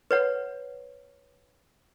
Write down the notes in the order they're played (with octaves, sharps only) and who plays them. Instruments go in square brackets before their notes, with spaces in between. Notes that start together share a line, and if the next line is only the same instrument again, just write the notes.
[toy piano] B4 C#5 F#5